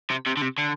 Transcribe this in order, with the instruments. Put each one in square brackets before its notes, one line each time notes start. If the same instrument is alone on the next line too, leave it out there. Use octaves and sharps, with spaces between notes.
[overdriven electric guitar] C3
C3
D3
C3
D3